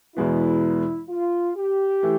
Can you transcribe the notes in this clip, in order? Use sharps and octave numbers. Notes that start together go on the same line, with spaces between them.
E2 B2 G#3 B3 E4
F4
G4
E3 A3